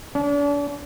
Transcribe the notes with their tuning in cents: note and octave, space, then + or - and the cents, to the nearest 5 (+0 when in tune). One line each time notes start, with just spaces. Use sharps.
D4 -40